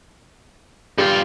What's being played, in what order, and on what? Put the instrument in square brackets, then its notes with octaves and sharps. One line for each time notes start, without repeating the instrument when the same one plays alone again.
[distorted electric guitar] G2 F4 [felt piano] G4